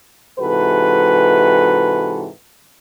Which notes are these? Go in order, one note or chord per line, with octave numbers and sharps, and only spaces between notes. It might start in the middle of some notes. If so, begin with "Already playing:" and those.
G#2 C3 E3 F#4 A4 B4